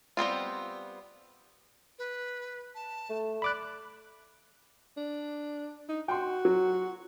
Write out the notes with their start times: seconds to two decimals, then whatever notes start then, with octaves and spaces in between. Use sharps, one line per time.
0.17 G3 B3 C4 F4
1.99 B4
2.75 A5
3.10 A3
3.42 D5 B5 D6 F#6
4.97 D4
5.89 D#4
6.08 F#4 G5 C6
6.45 F#3